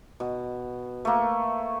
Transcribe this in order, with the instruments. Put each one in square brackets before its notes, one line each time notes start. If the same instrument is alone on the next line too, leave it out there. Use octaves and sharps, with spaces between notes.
[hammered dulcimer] B2
A3 A#3